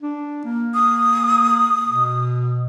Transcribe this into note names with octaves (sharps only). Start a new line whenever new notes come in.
D4
A#3
D#6
B2